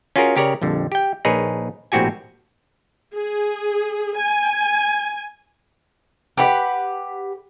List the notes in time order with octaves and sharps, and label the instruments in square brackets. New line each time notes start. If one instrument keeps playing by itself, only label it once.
[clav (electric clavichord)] C#4 F4 F#4 G#4 A#4
C#3 G4 A#4 C#5 D5
A#1 F2 D3 G3
G4 G5
A#1 D#4 G#4 A#4 B4 C#5
A#1 A2 C4 F#4 G4 G#5
[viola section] G#4
G#5
[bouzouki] G4 B4 F#5